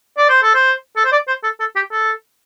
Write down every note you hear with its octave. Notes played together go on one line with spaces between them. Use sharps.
D5
C5
A4
C5
A4
C5
D5
C5
A4
A4
G4
A4